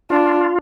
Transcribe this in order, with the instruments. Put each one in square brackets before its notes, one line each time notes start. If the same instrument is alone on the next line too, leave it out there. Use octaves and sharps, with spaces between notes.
[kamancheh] D4 [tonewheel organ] F4